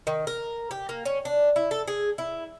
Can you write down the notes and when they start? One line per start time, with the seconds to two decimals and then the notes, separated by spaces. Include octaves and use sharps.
0.07 D#3
0.27 A#4
0.71 G4
0.89 A#3
1.05 C#4
1.25 D4
1.56 E4
1.71 A4
1.87 G#4
2.18 E4